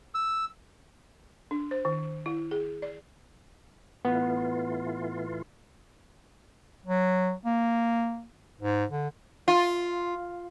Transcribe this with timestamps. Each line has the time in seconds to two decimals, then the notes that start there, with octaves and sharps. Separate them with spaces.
0.14 E6
1.51 D4
1.71 C5
1.85 D#3
2.26 E4
2.51 G#4
2.82 D5
4.05 A2 E3 B3 F4
6.86 F#3
7.45 A#3
8.61 G#2
8.90 D3
9.48 F4